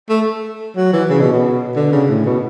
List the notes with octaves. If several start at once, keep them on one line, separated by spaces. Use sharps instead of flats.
A3
F#3
E3
C#3
B2
B2
D3
C#3
A2
B2